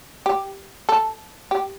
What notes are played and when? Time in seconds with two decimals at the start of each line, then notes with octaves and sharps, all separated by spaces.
0.26 G4
0.89 A4
1.51 G4